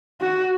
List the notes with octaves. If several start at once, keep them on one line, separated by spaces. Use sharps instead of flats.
F#4